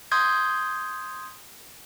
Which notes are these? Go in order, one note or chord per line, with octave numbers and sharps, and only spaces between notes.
C6 D#6 G6 G#6